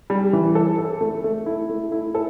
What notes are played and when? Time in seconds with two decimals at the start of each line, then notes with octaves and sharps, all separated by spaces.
0.10 G3
0.33 E3
0.55 A4
0.78 A4
1.01 A3
1.24 A3
1.46 E4
1.69 A3
1.92 E4
2.15 A4